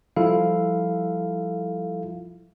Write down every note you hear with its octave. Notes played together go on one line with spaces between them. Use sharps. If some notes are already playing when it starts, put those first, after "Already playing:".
F3 G3 E4 F4 A4 F5